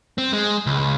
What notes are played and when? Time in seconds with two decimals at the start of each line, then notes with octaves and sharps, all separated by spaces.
0.18 C4
0.33 G#3
0.66 C#2